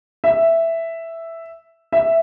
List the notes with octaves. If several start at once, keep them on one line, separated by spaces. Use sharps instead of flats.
E5
E5